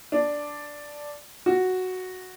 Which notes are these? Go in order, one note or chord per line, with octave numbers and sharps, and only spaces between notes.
D4
F#4